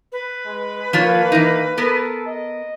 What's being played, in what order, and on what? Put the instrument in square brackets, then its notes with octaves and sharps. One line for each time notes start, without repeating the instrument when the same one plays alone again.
[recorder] B4
[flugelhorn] G#3
[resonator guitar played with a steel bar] F3 F4 C#5 [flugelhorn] A#3
[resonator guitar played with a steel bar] E3 D#4
[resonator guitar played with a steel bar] B3 A#4 [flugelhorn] A4
[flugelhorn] D#5